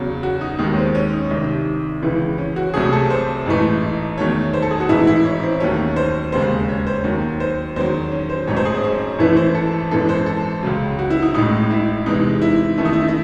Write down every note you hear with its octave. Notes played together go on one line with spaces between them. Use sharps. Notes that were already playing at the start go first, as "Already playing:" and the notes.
Already playing: E2 C#3 F#3
F#4
D#4
D#2 D#3 G#3 D#4
C#4
C4
C#4
D#4
C2 C3 D#3
C#2 C#3 E3
C#4
F#4
C2 C3 F#3 A3 G#4
A4
C5
A1 G#2 E3 A3
E2 D#3 F#3 A3 C#5
C5
A4
G#4
F#4
A1 G#2 E3 E4
E4
C#4
C4
D#2 D#3 F#3 A3 C#4
C5
E1 D#2 C#3 G#3 C5
C#5
C5
D#2 D#3 F#3
C5
E2 D#3 F#3 C5
C#4
C5
A1 G#2 F#3 A3 C#5
C5
G#4
C4
C#4
G#1 F#2 E3 A3 E4
C5
A4
G#1 F#2 E3 G#3 A4
C5
A4
C#2 C#3 F#3
F#4
E4
D#4
A1 A2 G#3 D#4
E4
E2 C3 E3 G#3 D#4
E4
F#2 D#3 A3 E4
D#4
E4
E4